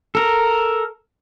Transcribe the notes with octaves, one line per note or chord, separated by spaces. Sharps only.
A4 A#4